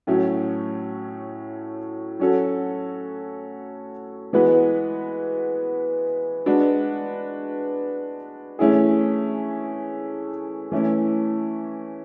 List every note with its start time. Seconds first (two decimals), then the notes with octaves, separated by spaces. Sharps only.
0.07 A2 F#3 A3 C#4
2.19 F#3 C#4 F#4 A4
4.33 E3 G#3 B3 F#4 B4
6.46 G#3 D4 F#4 B4
8.59 E3 A3 C#4 E4 G#4
10.72 E3 A3 C#4 E4